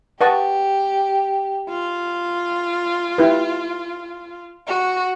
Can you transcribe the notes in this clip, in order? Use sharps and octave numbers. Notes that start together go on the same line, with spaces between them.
G4 B4 D#5 F#5 A5 C#6
F4
E4 G4 B4
F#4